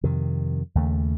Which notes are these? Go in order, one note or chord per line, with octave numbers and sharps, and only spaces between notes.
F2 C3 D#3
D#2 C#3 A3